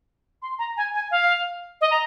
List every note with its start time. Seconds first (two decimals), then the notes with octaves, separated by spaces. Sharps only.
0.42 C6
0.59 A#5
0.77 G#5
0.94 G#5
1.11 F5
1.81 D#5
1.91 A#5